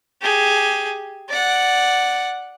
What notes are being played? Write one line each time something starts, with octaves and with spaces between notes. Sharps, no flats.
G4 G#4
D5 F#5